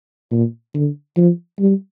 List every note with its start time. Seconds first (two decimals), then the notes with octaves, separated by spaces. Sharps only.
0.31 A#2
0.74 D3
1.17 F3
1.59 G3